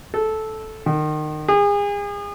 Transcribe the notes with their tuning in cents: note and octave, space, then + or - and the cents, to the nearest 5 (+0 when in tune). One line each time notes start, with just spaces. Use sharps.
A4 -10
D#3 -30
G#4 -35